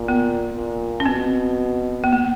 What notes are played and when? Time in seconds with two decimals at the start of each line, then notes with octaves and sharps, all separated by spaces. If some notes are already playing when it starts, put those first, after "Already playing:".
Already playing: A#2
0.08 B3
0.57 A#2
1.00 C#4
1.06 B2 C4
2.04 B3
2.13 A#3